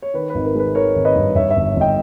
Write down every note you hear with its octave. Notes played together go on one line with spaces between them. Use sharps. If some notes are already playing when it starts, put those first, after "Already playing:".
C#5
D#3 B4
G#1 B4
A#4
G#3 B4
D#3 A#4 C#5
G#1
B4 D#5
G2
G2 C#5 E5
C#5 E5
G1
G1 D#5 G5